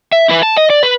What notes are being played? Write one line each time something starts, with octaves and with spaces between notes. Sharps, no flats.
E5
E4 B4
A5
D#5
D5
B4